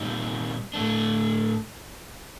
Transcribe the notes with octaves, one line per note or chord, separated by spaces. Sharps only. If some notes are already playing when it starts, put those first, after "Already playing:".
Already playing: A#2 G3 C4 D#4 G4
A2 A3 D4